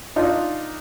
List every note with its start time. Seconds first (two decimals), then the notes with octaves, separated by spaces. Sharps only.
0.16 D4 D#4 F4